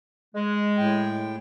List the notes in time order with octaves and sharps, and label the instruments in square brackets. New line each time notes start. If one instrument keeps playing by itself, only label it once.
[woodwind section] G#3
[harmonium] A2 G5